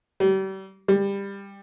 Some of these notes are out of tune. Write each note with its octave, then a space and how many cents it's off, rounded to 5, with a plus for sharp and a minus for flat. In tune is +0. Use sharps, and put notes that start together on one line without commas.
G3 -35
G3 +20